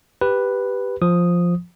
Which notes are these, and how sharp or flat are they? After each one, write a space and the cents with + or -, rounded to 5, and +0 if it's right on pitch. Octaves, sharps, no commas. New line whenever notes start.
G4 +0 B4 +0
F3 +0 D#6 +0